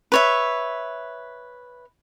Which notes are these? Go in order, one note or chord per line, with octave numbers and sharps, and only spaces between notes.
B4 C#5 E5